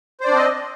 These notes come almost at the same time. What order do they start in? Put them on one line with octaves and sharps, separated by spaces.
C5 D5 D4 C4 D#5